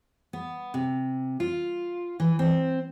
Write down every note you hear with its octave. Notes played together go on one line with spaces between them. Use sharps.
B3
C3
F4
E3
C4